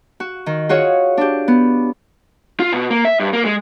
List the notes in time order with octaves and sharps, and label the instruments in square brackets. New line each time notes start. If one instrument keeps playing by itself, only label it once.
[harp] F#4
D#3
F4 F#4 G#4 C#5
D4 G4
B3
[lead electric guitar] F4
B2
A#3
E5
G2
A#3
G#3